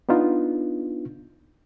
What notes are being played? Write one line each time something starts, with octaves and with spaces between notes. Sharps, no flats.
B3 D4 D#4 F4